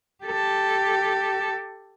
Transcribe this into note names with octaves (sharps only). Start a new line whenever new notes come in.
G4 A4